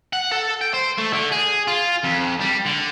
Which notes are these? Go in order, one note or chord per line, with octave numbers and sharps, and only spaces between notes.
F#5
A4
G5
C5
A3
D3
G#4
F4
F2
G3
D3